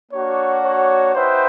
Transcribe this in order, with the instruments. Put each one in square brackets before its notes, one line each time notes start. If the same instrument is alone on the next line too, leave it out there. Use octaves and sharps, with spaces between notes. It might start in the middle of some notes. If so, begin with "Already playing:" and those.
[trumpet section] A#3 D4 F#4 [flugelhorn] C#5
[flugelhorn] C#5
[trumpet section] D#4 F#4 B4 E5 G5 [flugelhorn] C5